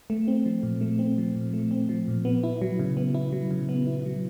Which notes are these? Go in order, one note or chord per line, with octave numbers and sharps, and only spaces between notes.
A3
C4
F3
A#2
A3
C4
F3
A#2
A3
C4
F3
A#2
B3
E4
F#3
C#3
B3
E4
F#3
C#3
B3
E4
F#3